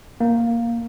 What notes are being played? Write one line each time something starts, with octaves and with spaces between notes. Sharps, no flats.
A#3